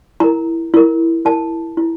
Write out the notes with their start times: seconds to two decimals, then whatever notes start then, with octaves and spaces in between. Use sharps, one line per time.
0.20 E4 A#4 A#5
0.74 E4 A#4
1.25 E4 A#4 A5
1.77 E4